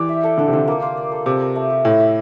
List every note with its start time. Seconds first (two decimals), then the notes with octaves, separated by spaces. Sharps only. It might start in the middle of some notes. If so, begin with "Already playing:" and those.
Already playing: E3 G4 D5
0.09 E5
0.24 A4
0.38 D3 A4
0.48 C3
0.53 D3 F4
0.68 A#3
0.82 F4
0.97 D5
1.12 A4
1.26 C3 D5
1.41 A#4
1.56 A3
1.70 G4
1.85 A2 E4
2.00 E5